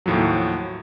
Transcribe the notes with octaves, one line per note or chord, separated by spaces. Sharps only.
D#2 A2 F3 F#3